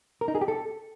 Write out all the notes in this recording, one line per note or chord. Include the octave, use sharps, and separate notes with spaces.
A#4
D#4
G#4
G4
A4